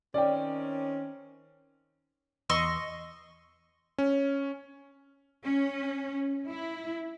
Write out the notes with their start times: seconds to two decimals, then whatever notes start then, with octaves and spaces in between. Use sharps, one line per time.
0.14 D#3 C4 C#4 D5 G5
2.50 E2 D#5 C6 C#6 E6
3.98 C#4
5.43 C#4
6.48 E4